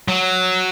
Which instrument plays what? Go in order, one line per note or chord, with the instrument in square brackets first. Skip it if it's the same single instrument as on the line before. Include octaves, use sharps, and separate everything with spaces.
[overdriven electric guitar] F#3